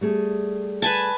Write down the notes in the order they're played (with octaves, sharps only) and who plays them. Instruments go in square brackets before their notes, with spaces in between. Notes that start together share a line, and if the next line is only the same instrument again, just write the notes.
[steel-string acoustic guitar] G3 A3 G#4
[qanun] B4 G#5 A5